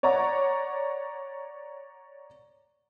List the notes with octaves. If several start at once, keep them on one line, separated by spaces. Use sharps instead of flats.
C#5 D5 F#5 A#5